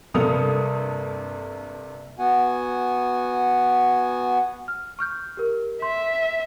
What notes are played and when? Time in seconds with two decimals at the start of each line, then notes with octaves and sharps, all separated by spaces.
0.14 G2 C3 A#3 A4 D#6 F7
2.19 B3 F#4 F#5 G#5
4.68 F6
4.99 C#6 F6 G6
5.37 G4 A#4
5.82 E5 C6